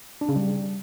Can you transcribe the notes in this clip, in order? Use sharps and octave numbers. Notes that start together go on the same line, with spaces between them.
D4
C#3
G3